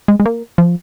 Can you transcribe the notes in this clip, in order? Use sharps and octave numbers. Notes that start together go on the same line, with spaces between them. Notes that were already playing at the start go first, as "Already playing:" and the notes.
G#3
G#3
A#3
F3